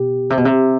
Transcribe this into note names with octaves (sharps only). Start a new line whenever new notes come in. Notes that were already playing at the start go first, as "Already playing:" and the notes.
Already playing: B2 G4
C3
B2
C3